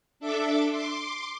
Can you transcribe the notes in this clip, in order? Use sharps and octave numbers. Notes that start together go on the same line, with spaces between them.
D4 A4 E5 D6
C6 D6